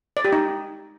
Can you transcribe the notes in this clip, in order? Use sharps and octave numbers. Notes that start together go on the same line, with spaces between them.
D5
G4
D#4